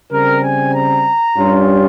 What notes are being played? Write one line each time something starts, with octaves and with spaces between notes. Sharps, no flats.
C#3 G3 C4 A#4
G#5
A#5
G2 G3 C#4 F4